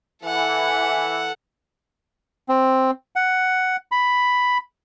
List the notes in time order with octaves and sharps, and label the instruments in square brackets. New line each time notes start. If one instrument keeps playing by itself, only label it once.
[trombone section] E3 [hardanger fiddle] A4 F#5
[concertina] C4
F#5
B5